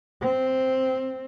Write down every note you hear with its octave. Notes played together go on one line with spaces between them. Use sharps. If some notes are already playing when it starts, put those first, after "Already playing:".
C4